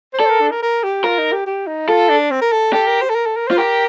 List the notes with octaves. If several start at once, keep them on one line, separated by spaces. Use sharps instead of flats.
C5
A4 D5
C5
A#4
D4
A#4
A#4
G4
F4 A#4
D#4
G4
G4
D#4
F4 A4
D4
C4
A#4
A4
G4 A4
A#4
C5
A4
A#4
A4
A#4
F4 C5
G4 A#4